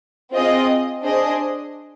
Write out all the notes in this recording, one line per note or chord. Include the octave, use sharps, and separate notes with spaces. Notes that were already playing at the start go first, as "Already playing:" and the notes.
C4 F4 G#4 D#5
D4 G#4 C5 D#5